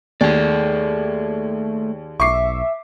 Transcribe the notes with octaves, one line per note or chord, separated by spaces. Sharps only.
D#2 A3 G#4 D5
B1 E5 C#6 D6 C7